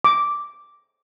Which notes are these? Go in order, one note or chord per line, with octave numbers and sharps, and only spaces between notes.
D6